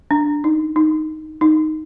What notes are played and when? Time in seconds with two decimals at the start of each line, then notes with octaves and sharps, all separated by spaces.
0.11 D4
0.44 D#4
0.76 D#4
1.41 D#4